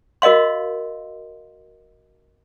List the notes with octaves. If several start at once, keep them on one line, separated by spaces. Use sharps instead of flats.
F#4 A#4 D#5 F5 C6